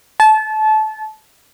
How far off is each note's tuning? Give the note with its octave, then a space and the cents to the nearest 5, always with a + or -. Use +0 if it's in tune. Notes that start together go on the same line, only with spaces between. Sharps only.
A5 -25